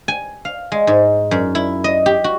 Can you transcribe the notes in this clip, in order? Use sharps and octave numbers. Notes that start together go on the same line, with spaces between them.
G#5
F5
G#3
G#2
F#2
E4
D#5
G4
F#4